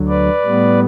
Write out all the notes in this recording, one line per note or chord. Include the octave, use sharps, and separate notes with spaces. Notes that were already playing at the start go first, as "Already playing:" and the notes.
Already playing: D2 D3 F#3
B4 D5
A2 G3 B3